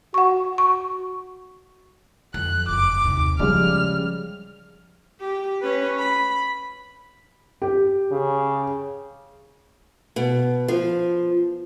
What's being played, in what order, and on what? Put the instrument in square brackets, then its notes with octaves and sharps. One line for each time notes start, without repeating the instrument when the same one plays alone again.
[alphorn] F#4 [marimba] F#5 C#6
[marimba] C#6
[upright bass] F2 [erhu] F#6
[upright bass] F#1 [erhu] D6
[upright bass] D#2 C3
[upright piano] C#3 G3 G#3 [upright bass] F3 [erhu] F6
[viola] G4
C#4 B4
B5
[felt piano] G4
[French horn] C#3
[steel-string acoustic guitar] B2
F3